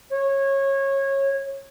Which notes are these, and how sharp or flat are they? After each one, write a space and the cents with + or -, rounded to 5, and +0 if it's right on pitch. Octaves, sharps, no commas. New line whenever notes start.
C#5 -20